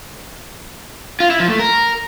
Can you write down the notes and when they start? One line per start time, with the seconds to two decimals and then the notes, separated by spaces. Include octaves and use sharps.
1.20 F4
1.30 E4
1.40 F3
1.50 A3
1.60 A#4